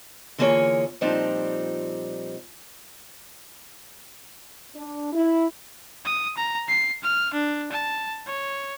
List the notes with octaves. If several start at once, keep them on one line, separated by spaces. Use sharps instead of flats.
D3 E3 A#3 F4 G#4 C#5
A#2 F3 G3 C4 D4 D#4
D4
E4
D#6
A#5
C7
F6
D4
A5
C#5